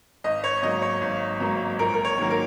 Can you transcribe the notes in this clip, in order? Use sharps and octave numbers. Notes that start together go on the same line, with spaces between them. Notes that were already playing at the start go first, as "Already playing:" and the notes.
G#1 D#5
C#5
G#2 F#3 A#3 D#5
C#5
G#1
G#2 F#3 A#3
A#1 A#4
A#4
C#5
G#2 D#3 F#3 A#3
A#4